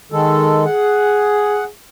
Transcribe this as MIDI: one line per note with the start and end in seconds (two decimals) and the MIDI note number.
0.12 0.64 51
0.12 0.64 56
0.12 0.64 69
0.65 1.68 68
0.65 1.64 78